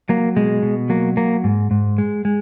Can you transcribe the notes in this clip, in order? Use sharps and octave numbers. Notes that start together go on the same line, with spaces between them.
F#3 A#3
B2 G#3
B2
F#3 A#3
F#3 A#3
G#2
G#2
G#3
G#3